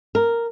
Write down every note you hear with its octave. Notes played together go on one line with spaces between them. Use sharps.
A#4